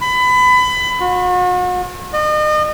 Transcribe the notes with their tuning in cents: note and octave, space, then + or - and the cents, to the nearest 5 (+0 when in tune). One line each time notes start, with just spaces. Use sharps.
B5 +25
F#4 -40
D#5 -35